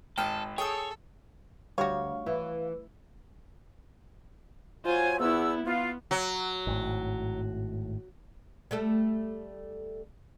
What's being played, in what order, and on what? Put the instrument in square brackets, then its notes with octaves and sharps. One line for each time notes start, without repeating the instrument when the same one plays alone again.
[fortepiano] G#1 [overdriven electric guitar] A4 [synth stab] G5 F6 D#7
[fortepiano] G#4 [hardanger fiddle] A4 [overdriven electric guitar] C#5 [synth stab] G5 D#6 E6
[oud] D2 [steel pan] G3 G4 [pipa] F#4 C#5 [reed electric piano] F5
[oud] E3 [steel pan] E4
[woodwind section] F#3 G#5 [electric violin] F4 C5
[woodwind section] E2 E6 [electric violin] B3 E4
[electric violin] B3 [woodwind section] F4
[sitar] F#3
[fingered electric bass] G#1 A2
[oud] G3 A3 A4